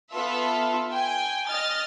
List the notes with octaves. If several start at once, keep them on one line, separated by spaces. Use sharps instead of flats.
B3 F4 A4 E5
G5 G#5
D#5 F6 A6